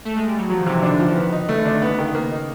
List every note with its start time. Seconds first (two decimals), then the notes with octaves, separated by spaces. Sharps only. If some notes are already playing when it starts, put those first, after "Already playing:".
0.05 A3
0.16 G#3
0.27 G3
0.38 F#3
0.50 F3 F#3
0.60 D#3
0.66 C3 E3
0.83 D3 D4
0.92 C#3
1.00 F3
1.08 D#3
1.16 B3
1.33 D#4
1.49 C#3 A3
1.57 D3
1.65 D#3 D4
1.74 D3
1.82 C#3 B3
1.98 D#3
2.15 A#3
2.31 D#4